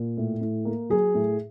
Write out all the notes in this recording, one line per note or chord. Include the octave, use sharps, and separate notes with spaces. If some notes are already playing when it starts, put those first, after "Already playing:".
Already playing: A#2
A2
A2
A#3
F#3 G#4
A2